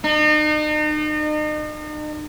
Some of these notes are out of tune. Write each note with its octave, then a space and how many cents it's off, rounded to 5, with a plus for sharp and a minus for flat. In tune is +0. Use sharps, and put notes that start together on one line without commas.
D#4 -40